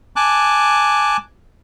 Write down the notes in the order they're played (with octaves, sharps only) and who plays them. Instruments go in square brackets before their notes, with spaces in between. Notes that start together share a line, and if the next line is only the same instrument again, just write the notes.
[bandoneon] G#5 A5 D6 F#6